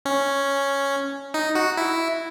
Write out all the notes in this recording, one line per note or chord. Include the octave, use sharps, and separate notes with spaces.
C#4
D#4
F#4
E4